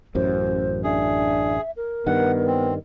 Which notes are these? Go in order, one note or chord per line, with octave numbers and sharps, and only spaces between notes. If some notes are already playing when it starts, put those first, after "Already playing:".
A1 F#2 C5
D4 G#4 E5
A#4
G2 D#3 B3 F#5
C4